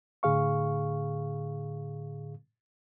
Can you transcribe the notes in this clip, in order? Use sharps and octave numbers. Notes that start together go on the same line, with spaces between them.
A2 D3 G#4 F5 C#6